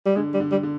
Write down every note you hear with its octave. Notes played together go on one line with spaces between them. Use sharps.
G3
D3 G#3
G3
D3
G3
D3